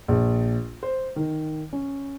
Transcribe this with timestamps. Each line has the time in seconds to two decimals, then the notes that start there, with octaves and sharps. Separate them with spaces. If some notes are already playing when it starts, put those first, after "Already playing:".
0.08 A#1
0.83 C5
1.16 D#3
1.73 C#4